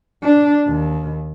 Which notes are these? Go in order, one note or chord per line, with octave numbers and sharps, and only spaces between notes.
D4
D#2